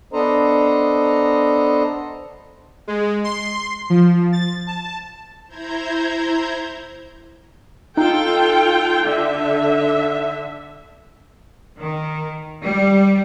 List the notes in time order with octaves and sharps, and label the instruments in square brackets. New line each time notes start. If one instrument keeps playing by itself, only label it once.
[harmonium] B3 D4 A4 C5 D#5 A#5
[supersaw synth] G#3
C6
F3
A6
A5
[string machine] E4 C5 A#5 G6 G#6
[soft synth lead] D#4 [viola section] F4 A4 G5
[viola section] D3 E5
[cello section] D#3
G3